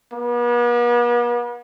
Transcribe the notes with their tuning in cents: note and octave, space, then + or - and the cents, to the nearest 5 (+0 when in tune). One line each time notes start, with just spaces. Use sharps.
B3 -45